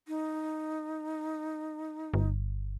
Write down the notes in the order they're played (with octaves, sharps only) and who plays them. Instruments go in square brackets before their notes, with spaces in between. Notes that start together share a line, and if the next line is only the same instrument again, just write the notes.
[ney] D#4
[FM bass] G1